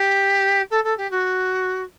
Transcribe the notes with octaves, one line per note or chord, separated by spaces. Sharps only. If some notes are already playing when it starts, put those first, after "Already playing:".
Already playing: G4
A4
A4
G4
F#4